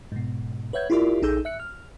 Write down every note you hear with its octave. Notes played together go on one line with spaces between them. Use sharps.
G#2 B2
B4 C#5 E5 F#5 G6 G#6
E4 F4 G4 A#4 D5 E5
A#1 D#4 G#4 A4 E6 G6
E5 F#6 C#7
F6